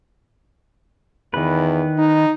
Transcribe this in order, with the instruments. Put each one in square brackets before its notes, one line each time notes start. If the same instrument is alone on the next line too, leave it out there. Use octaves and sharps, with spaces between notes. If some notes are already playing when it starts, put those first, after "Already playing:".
[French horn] E2 [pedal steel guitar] D#3 B4
[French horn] D#4